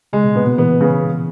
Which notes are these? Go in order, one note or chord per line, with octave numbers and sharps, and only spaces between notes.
C#3 G#3
B2
A#2 B3
B2
E3 B3
C#3